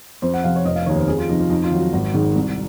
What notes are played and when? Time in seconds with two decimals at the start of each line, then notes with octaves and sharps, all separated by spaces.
0.22 F2 C5
0.34 F#5
0.44 C3 F3 F5
0.56 C#5
0.66 F1 D#5
0.76 F5
0.86 D#2 D#3 C#5
0.97 C5
1.08 F2 G#4
1.18 F4
1.29 C3 F3 D#4
1.40 F4
1.50 F2 D#4
1.64 F4
1.72 D#3 F#3
1.79 F#4
1.93 G#1
2.14 G#2 D#3
2.36 C2